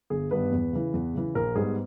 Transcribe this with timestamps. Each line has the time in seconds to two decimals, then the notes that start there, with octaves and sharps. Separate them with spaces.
0.10 G1 G#4
0.31 G2 D#3 G3 B3 B4
0.52 E2
0.73 C#3 E3
0.93 E2
1.14 C#3 E3
1.35 A#1 A#4
1.55 G#2 G3 B3 G#4